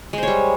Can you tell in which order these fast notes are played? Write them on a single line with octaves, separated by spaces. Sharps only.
G#3 C5 C#5 G3